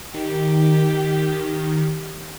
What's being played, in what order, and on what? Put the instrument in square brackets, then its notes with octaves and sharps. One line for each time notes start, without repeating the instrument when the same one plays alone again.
[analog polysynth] D#3 [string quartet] G4